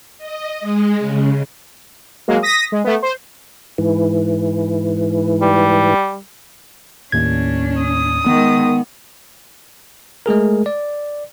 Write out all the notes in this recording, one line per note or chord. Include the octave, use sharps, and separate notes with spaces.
D#5
G#3
C#3
F#3 G#3 A#3
D#6 A#6 B6
G#3
A3 B3
C5
G#2 E3
G3
D#2 A2 C#4 D4 G#6
D#6
D#3 G#3 B3
G#3 A3 G#4 A#4
D5